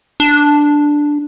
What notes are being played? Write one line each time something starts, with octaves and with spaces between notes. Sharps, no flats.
D4